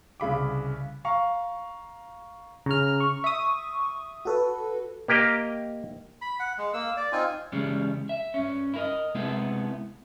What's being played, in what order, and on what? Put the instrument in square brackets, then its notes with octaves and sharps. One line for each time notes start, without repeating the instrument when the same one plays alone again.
[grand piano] C2 C#3 B5 D6
F5 A#5 C#6
[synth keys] C#3 F6 [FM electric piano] A#5
[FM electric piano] C#6
[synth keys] E5 D#6
[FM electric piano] F#4 A4 B4
[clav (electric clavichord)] A#3 G4 A#4 D#5
[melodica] B5
F#5
G#3
A#3 E6
D5
C4 D#4 F4 G#5
[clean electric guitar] C#3 E3 G3 G#3 C#4
E5
G2 C#4
E4 A#4 D#5
C3 G#3 A3 B3 C4 E4